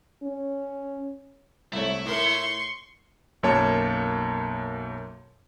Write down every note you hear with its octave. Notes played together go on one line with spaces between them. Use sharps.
C#4
C2 A3 E4 C#5
A2 A#4 C6 C#6
B1 F#2 A#3 C#5 A5